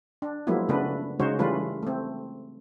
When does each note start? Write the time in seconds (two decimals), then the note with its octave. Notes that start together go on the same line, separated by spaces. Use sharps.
0.22 D4
0.47 F3 F#3 G#3 A#3 B3 E4
0.69 C#3 A3 B3 D4 B4
1.20 C#3 G#3 D#4 F#4 C5 C#5
1.39 E3 G3 A3 C#4 F4 B4
1.83 A3 C4